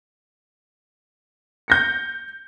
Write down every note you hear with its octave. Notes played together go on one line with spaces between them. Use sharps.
G6 A#6 C#7